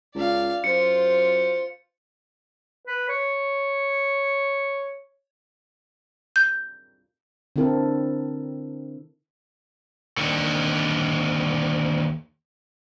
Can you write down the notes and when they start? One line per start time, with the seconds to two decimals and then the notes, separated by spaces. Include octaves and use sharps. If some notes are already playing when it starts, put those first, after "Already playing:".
0.15 C#2 D5 F5
0.64 F#2 F4 C5 C#7
2.87 B4
3.09 C#5
6.36 G6
7.56 D3 C4 E4 A4 A#4
10.17 D#2 D3